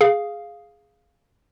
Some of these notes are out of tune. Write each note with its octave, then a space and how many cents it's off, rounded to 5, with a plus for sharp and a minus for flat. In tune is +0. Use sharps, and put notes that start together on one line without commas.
G#4 +0 F5 +0